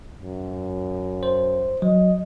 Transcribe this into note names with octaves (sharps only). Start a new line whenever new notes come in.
F#2
C5
F#3 D#5